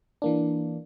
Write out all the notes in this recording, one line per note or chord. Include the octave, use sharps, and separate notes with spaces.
E3 A#3 D4